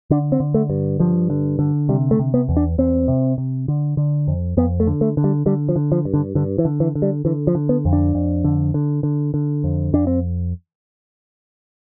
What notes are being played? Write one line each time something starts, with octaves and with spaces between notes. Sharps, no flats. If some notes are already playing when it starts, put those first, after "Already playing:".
D3 D4
C4
D3
A3
G2
G2 F3
D3
D3
C3 G3
A3
C3
B3
E2
D4
E2 C4
C3
C3
D3
D3
F2
F2 B3
A3
D3
A3
D3
G3
D3 G3
F3
D3
F3
G2
D3
G2 D3
E3
D3
E3
D3
G3
D3 E3
F3
D3
B3
F2
D4
F2
D3
D3
D3
D3
F2
F2 D4
C4